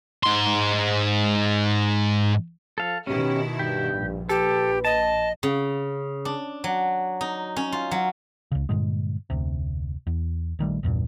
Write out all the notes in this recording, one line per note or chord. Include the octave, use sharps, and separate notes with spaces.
G#2 C6
F3 A4 F5
B2 D#3 C#4 E4 G4
G2 G4
A#1
G4 A4 B4
D#5 A5
C#3
D4
F#3
D#4
C#4
F4
F#3
C#2 C#3
G2 A#2 D3 G#3
F1 D2 C3
E2
A#1 D#3 G3 A3
A#1 E2 G2 A#2